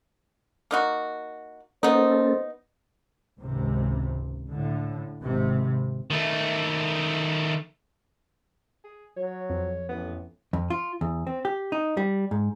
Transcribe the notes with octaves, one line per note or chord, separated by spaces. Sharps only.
A#3 D#4 F#4
A#3 B3 C#4 D#4 A4 C5
G#1 C#2 C3
A2 D3
G#1 C3
D#3 A3
G#4
F#3 C#5
F2
A1 B3
F2
F4
E2
C4
G4
D#4
G3
G#2